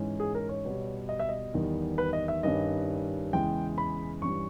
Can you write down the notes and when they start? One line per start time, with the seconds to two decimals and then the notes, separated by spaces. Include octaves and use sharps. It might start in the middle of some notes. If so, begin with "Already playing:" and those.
Already playing: G#2 E3 G#3 C#4
0.20 G#4
0.35 A#4
0.49 C#5
0.65 B2 G3 B3
1.09 D#5
1.20 E5
1.29 D#5
1.54 E2 D#3 G3 B3
1.98 B4
2.13 D#5
2.28 E5
2.43 G2 D#3 G3 C#4 D#5
3.33 E2 C#3 E3 G#3 G5
3.78 B5
4.22 G2 E3 G3 C#4 C#6